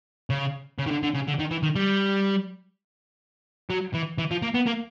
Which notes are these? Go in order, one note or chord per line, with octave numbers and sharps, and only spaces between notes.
C#3
C#3
D#3
D3
D3
C#3
D3
D#3
E3
D#3
G3
F#3
E3
E3
F3
A#3
B3
A#3